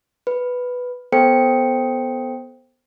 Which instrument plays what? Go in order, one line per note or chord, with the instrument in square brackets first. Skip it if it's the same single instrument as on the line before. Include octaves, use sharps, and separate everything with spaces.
[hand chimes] B4
B3 A4 C5 G5 C#7